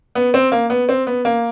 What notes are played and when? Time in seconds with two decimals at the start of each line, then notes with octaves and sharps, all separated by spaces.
0.15 B3
0.34 C4
0.52 A#3
0.70 B3
0.89 C4
1.07 B3
1.25 A#3